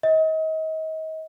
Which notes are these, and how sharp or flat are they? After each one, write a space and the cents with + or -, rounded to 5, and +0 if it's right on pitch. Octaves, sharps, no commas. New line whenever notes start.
D#5 +35